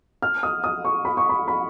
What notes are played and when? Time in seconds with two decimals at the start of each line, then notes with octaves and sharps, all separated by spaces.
0.22 F6
0.43 D#6
0.64 D#6
0.85 C#6
1.05 B5
1.17 C#6
1.29 B5
1.48 B5